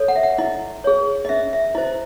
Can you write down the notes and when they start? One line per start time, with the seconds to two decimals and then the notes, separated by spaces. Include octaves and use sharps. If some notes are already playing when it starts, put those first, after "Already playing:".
Already playing: A4 C#5
0.08 F#5
0.16 E5
0.23 F#5
0.38 E4 D#5
0.84 G#4 C#5
1.25 D#5
1.29 C#4 E5
1.53 E5
1.75 E4 C5 D#5